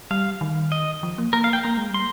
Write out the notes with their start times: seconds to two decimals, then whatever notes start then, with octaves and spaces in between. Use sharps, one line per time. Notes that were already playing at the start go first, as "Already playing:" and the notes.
0.11 G3 F5
0.41 D#3
0.72 D#5
1.03 F3
1.18 A#3
1.33 A#3 A#4
1.44 F5
1.53 G5
1.63 A#3 A#5
1.77 G#3
1.90 G3 C6